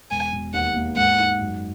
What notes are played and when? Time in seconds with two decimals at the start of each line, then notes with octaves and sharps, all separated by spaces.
0.11 E1 G#5
0.32 E1
0.53 D#2 F#5
0.75 A#3
0.97 G#2 F#5
1.19 D#4
1.40 F#2